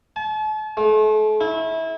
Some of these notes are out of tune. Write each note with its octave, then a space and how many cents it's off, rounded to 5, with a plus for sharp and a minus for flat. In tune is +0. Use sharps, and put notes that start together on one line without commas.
A5 -40
A3 -40
E4 -25